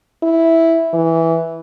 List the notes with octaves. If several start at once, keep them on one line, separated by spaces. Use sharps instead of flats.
E4
E3